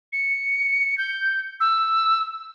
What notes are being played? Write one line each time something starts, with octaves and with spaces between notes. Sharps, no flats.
C#7
G6
E6